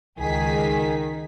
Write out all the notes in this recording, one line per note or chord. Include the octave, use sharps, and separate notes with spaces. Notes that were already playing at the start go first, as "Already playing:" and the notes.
C#2 D#3 G#4 B6